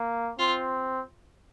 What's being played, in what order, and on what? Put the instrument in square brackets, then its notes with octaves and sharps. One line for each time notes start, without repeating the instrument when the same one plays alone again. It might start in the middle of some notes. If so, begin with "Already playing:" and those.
Already playing: [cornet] A#3
[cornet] C4 [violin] F4